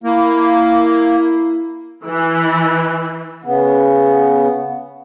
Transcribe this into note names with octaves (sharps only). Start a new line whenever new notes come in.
A#3 E4
E3
C#3 B3